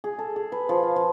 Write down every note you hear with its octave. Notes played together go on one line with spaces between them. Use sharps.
G#4
A4
G#4
B4
F3
F5
F3